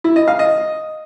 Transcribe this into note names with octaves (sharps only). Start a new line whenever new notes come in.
E4
D#5
F5
D#5